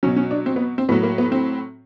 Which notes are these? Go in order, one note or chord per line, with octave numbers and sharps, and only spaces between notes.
B2 F#3 C#4
C#4
D4
C4
B3
C4
A2 F#3 B3
A#3
B3
C4